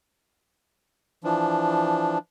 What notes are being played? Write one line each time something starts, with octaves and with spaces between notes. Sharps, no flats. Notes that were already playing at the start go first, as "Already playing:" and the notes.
E3 F3 D4